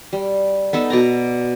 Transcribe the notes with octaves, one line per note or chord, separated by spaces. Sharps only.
G3
B3 D#4 A4
B2 D5 A#5